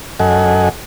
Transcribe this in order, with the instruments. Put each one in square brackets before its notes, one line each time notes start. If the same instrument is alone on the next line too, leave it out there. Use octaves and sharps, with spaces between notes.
[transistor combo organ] F#2 A4 D#5 F#5 G#5